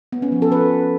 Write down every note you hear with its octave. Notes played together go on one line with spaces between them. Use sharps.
B3
C#4
F3
A4
B4